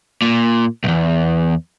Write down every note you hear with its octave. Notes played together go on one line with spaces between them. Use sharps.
A#2
B1 E2